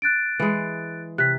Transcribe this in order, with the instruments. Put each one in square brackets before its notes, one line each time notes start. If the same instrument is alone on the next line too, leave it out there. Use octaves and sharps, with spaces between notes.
[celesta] F#6 A6 D7
[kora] E3 G#3
[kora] C3 [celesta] F#6 B6